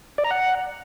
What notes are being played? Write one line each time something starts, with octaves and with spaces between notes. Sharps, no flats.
D5
A#5
F#5